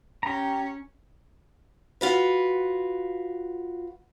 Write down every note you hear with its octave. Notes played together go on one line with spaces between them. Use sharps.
C#4 G4 A#5
F4 F#4 B4